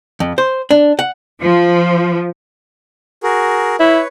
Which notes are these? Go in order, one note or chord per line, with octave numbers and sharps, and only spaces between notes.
F2
C5
D4
F#5
F3
F#4 G#4 A#4
E4 B4 C#5